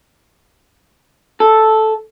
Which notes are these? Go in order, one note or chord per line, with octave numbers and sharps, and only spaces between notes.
A4